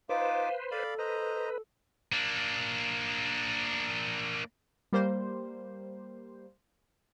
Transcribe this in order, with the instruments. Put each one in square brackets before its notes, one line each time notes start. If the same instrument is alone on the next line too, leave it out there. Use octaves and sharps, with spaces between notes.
[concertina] D#4 F4 D6 [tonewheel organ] B4 C5 [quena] F5
[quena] A4 [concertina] D5 F5 B5
[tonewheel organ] B4 [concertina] C5 D#5 A#5
[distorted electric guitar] A#3 D4
[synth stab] G3 A#3 C5